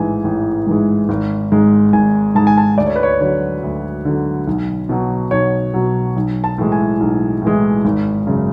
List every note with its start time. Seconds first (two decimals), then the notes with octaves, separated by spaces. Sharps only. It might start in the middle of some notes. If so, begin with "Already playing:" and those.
Already playing: A1 G#2 E3 G#3 G#5
0.24 A1
0.67 G#2 E3 G#3
1.09 G#1
1.52 G#2 G#3
1.93 G#1 G#5
2.35 G#2 G#3 A5
2.47 G#5
2.58 A5
2.78 D2 D5
2.86 C#5
2.96 B4
3.03 C#5
3.21 D3 F#3 C#5
3.63 D2
4.05 D3 F#3
4.47 B1
4.89 B2 F#3
5.31 B1 C#5
5.74 B2 F#3
6.16 B1
6.44 A5
6.58 A2 E3 G#3
6.72 G#5
7.00 B1
7.42 A2 E3 G#3
7.85 G#1
8.27 F#2 C#3